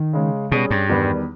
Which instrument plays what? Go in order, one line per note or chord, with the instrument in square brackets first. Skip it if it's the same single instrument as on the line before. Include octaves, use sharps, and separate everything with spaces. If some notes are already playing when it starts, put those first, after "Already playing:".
Already playing: [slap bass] D#3
[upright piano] C#3 G#3 C#4
[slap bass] B2 [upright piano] G3 C#4 G#4
[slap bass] G2
[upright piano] E2 D#3 G3 B3